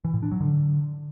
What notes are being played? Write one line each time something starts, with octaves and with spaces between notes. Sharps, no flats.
E3
A2
D4
F#3
D3